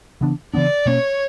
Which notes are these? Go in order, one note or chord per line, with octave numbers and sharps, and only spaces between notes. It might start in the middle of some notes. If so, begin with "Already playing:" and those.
C#3 E3 B3 D4
C#3 E3 B3 D4 D5
B2 A#3 C#4 C#5